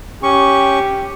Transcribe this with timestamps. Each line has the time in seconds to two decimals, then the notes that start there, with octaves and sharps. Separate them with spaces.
0.23 C#4 G4 C#6